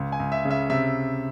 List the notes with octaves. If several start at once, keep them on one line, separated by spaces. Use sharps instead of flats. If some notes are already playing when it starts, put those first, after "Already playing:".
Already playing: C#2
G#5
C#2
E5
C#3
E5
C3 E5